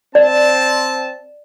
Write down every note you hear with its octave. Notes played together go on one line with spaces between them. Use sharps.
C4 D5 A5